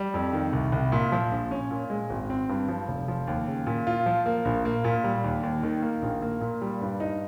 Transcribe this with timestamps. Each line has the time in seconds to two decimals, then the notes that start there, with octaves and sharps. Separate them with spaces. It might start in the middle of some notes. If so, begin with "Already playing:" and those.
Already playing: G3
0.14 F2
0.33 D#3
0.53 C2
0.72 C2
0.92 A#2
1.12 F3
1.31 A#1
1.51 C#4
1.71 A#2
1.90 G#3
2.10 G#1
2.30 C4
2.49 G2
2.68 F3
2.88 F1
3.08 F3
3.27 D#2
3.47 C#3
3.67 A#2
3.87 F4
4.06 F3
4.26 A#3
4.45 A#1
4.65 A#3
4.84 A#2
5.04 G3
5.24 D#2
5.43 D#2
5.63 D#3
5.82 A#3
6.02 A#1
6.22 A#3
6.41 A#2
6.62 G3
6.81 G2
7.00 D#4